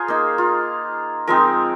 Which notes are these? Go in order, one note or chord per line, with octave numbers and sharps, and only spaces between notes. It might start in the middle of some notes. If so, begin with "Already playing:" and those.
Already playing: F4 G#4 A#4 C5
A#3 D#4
F4
F3 G#3 C4 D#4 A#4